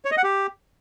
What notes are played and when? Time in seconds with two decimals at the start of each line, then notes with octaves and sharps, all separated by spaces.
0.05 C#5
0.11 D#5
0.17 F#5
0.24 G4